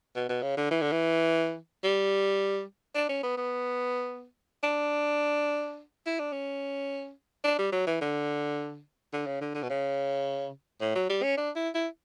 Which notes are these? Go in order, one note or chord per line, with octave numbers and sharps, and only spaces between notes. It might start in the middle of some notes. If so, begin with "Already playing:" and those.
B2
B2
C#3
D3
E3
D3
E3
G3
D4
C#4
B3
B3
D4
E4
D4
C#4
D4
G3
F#3
E3
D3
D3
C#3
D3
D3
B2
C#3
A2
F#3
G3
C#4
D4
E4
E4